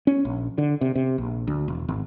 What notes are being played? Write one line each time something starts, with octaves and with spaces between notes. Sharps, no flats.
C#4
A#1
D3
C3
C3
A#1
D2
E1
G#1